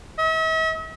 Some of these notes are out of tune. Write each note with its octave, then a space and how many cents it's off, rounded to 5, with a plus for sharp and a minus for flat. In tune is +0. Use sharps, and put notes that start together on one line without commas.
E5 -45